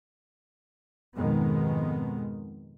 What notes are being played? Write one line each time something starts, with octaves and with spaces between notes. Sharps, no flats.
F2 G#2 B2 D#3 G#3 B3